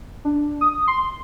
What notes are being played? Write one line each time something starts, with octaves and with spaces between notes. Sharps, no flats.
D4
D#6
C6